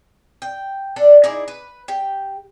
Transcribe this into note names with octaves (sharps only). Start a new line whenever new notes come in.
G5
D4 A4 D5
D#4 E4 G#4 D5
B4
G4 G5